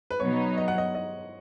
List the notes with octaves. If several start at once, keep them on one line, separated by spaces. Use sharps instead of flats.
B4
B2 F#3 B3 D#4 C#5
D#5
F#5
D#5
D#5